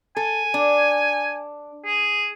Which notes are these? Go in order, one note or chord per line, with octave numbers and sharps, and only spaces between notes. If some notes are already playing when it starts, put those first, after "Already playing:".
A4 G#5
D4
G#4